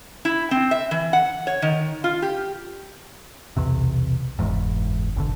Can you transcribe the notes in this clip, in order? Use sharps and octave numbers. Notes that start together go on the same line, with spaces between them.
E4
C4
E5
E3
F#5
C#5
D#3
F4
G4
B1 E2 C3
F#1 E2 G#2
F#1 B1 D3